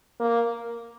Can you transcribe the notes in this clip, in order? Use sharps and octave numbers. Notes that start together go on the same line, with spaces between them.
A#3